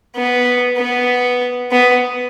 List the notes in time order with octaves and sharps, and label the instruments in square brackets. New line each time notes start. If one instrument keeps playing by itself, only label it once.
[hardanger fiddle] B3
B3
B3